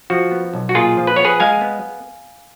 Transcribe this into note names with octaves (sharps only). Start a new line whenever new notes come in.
F3 F#4
B3
B1
F#4
A#2 F4 G#4
F3
B4
B3 C#5
G#4 B4
G#3 F5 G#5
B3